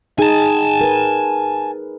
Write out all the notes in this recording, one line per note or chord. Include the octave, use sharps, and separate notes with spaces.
D#4 G#4 G#5 A5
A#4 B4